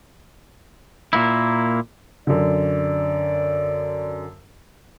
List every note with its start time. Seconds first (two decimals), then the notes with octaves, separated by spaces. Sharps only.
1.13 A#2 A#3 E4
2.27 F#2 D3 D5